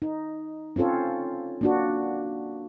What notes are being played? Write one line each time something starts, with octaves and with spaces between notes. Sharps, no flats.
D#4
C4 C#4 F4 A4 C#5
A#3 D4 F#4